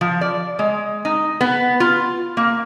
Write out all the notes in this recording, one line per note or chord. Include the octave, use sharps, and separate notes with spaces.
F3
D5
G#3
D#4
B3
F4
A#3